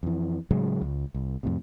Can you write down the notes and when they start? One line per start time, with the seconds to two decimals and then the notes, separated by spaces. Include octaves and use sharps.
0.03 F2 E3
0.51 A2 C#3 F#3 G#3
0.81 C#2
1.14 C2
1.43 F2 A2 C3